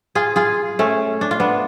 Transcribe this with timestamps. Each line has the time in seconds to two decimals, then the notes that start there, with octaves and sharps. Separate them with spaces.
0.15 F4 G#4
0.36 F4 G#4
0.79 A3 C#4
1.21 D4
1.31 F4
1.40 B3 D4